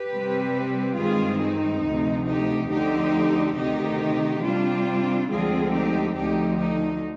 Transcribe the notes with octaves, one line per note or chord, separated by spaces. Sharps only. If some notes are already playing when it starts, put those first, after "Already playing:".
Already playing: G4 B4
C3 G3 C4
G2 D#3 G#3 C4 F4 G#4
D#4
D2 C3 F3
D#4 G4
D2 D3 F3 C4 D#4 G4
D2 C3 D#3 D#4 G4
C3 G3 C4 D4 F4
D2 D3 F3 G#3 C4 F4 G#4
D#4 G4
D2 D3 F3 D#4 G4
D#4